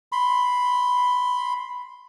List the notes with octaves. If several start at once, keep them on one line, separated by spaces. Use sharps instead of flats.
B5 C6